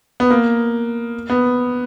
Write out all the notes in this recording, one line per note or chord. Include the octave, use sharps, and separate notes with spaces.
B3
A#3
B3